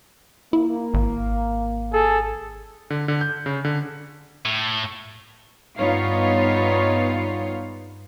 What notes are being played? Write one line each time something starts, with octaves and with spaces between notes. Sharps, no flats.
A#3 E4
G#1
G#4 A4
D3
D3
G6
C#3
D3
A2
G2 B3 D#4 F4 C#5 F5